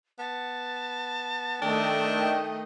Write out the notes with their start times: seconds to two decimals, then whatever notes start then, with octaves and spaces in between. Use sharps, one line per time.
0.19 B3 A5
1.62 D#3 A3 D4 D#5 G5